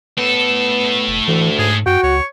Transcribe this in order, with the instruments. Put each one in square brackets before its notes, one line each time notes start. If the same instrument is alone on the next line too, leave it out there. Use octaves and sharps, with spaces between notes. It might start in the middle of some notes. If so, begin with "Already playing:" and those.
[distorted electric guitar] A2 A4 [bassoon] B3
[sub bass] F1
[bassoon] D2 [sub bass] E3
[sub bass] G#2 [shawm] G#4
[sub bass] F#2 [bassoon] F#4 [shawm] G5
[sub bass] C#2 [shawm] C#5